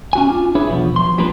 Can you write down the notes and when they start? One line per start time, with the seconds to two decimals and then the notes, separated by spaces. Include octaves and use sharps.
0.13 C#4 F#4 G#5
0.28 D4 F4
0.55 D4 E4 G#4 B4 C#5 E5
0.68 B1 E2 B2 F3 B3
0.96 F3 C6
1.18 F3 G3 A#3 D4 A#4 B4